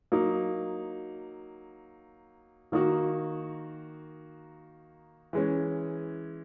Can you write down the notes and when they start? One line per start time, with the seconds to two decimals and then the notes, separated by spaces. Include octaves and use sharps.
0.12 F#3 A#3 D#4
2.72 D#3 A#3 D#4 F#4
5.33 E3 G#3 C#4